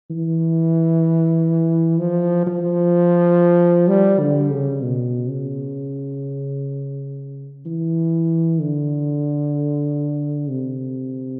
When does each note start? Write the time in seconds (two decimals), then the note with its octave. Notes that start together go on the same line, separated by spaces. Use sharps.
0.10 E3
1.99 F3
2.47 F3
3.88 G3
4.20 D3
4.51 C#3
4.82 B2
5.29 C#3
7.66 E3
8.60 D3
10.49 C3